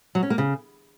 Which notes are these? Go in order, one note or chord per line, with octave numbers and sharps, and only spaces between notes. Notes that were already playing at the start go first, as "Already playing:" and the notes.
F#3
C#4
A#3
C#3